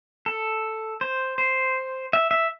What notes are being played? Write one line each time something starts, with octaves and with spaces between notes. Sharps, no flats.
A4
C5
C5
E5
E5